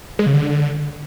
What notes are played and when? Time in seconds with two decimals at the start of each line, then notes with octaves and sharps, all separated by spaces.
0.19 G#3
0.26 C#3
0.34 D3